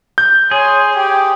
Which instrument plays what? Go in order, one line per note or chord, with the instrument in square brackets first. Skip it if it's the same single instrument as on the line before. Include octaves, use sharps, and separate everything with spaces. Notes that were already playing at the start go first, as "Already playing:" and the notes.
[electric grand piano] G6
[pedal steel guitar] G#4 [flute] C#5 [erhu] C6
[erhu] G4 [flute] G5